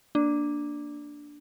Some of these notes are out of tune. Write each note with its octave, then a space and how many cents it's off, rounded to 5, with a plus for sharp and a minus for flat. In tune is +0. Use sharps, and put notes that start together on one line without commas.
A#3 +0 D4 +0